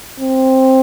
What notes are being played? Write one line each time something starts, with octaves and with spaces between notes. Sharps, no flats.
C4